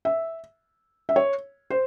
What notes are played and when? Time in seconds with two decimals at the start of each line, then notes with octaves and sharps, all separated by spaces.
0.05 E5
1.09 E5
1.16 C#5
1.70 C5